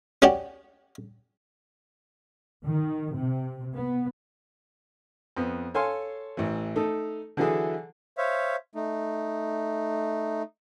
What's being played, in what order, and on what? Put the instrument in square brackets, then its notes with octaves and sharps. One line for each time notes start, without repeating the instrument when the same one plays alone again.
[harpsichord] C#4 F#4 G4 D5
[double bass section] D#3
C3
B3
[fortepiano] F2 B3
A4 C#5 F5 G#5 C6
A1 E3
A3 D#4 A4
D3 E3 F#3 E4 G#4 A4
[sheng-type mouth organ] C5 C#5 E5 F5
A3 D#4